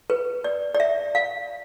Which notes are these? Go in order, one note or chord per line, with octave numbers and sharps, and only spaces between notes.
B4
D5
D5
E5
F5